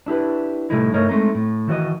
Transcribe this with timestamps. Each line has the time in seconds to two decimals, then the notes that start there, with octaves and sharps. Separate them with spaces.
0.06 D4 E4 G4 B4
0.70 A2 C3 G3 A3 D#4 E4
0.93 G2 A3 D#4 A#4 C#5 D#5
1.09 G#3 A3 C4 D#4
1.35 A2
1.68 D#3 E3 F#4 D5 D#5